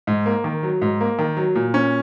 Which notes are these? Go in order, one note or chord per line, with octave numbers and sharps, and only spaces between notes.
G#2
A#3
D#3
F#3
G#2
A#3
D#3
F#3
A#2
C#4